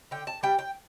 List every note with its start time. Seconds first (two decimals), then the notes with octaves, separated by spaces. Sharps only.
0.11 D3 G5
0.27 A5
0.43 G3 G5
0.59 G5